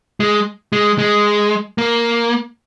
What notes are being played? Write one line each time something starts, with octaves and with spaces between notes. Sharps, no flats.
G#3
G#3
G#3
A#3